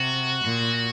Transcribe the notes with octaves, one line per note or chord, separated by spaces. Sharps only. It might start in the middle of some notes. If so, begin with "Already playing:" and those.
Already playing: C3 F#4
A#2